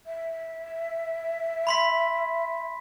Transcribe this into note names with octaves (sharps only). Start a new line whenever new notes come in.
E5
B5 C6 B6